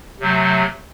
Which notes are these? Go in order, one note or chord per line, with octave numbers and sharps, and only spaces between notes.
C3 F#3 A3